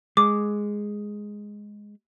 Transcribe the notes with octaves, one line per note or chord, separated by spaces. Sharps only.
G#3 D6